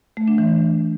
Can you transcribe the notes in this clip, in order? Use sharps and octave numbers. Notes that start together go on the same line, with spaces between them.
A3
D4
E3